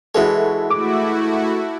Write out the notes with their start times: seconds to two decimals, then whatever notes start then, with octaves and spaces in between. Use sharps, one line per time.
0.15 E3 G#3 E4 F#4 A4 C#5
0.70 A3 E4 F#4 D6